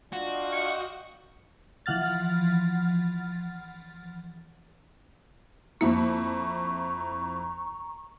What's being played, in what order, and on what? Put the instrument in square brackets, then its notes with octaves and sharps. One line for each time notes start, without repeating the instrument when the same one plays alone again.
[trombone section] D4 F4 [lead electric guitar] F#4 [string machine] D#5 F5 G5
[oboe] C#6
[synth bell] E3 F3 F#5 F6 A6
[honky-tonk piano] F2 E4 [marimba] A#3 [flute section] A#5 C#6